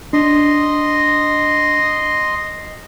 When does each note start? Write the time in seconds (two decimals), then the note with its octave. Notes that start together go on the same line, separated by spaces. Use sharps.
0.13 D4 D#5 C6